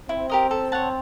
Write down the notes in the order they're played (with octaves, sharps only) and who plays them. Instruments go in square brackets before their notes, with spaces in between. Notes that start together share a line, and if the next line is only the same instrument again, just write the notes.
[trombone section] C4 [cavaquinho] E4
[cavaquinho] G4 A#4 D#5
A4
C#5 F#5 A5